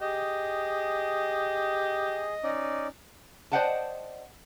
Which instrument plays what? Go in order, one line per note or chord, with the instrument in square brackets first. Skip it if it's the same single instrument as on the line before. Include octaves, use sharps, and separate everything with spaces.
[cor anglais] G4 [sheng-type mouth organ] G#4 [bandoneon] D#5
[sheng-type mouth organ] C#4 D#4 D5
[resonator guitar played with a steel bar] C5 D5 D#5 F#5 G5 A5